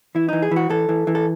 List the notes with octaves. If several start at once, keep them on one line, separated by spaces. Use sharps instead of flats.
E3 E4
E3 D#4
G#4
E3 F#4
E3 A4
E3
E3
A4